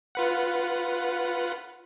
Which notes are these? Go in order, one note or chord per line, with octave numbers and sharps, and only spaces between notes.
F4 B4 F#5